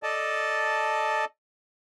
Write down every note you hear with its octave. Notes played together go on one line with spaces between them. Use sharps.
A4 D5 D#5 A5